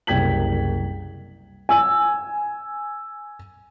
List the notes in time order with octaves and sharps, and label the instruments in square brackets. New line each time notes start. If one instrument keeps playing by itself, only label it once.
[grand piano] F#1 C2 G5 G#6 B6 F#7
[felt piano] G#5 E6